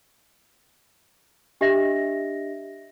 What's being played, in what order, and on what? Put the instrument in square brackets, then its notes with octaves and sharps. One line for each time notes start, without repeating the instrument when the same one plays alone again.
[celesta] D4 G4 D#5 E5 A#6